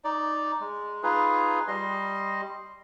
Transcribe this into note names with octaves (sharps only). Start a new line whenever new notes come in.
D#4 D5
G#3
D#4 F4 G#4 B4
G3 D#5 C6